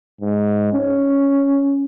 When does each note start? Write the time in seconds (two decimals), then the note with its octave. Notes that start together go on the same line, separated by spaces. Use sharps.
0.21 G#2
0.73 C#4